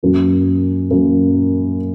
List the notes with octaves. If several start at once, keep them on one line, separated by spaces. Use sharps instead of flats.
F#2 F#3 A#3
F#2 F#3 A#3